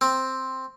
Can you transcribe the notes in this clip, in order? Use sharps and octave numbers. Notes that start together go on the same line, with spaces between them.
C4